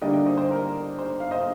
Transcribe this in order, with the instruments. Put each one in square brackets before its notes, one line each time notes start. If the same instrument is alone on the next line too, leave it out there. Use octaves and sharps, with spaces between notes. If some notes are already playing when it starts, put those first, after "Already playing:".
[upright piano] D3 G3 A#3 D4 D#5 G5
D#5 G5
C5 D#5
C5
A#4
C5
F5
C5 D#5